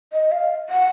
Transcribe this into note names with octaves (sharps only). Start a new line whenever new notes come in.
D#5
F5
F#5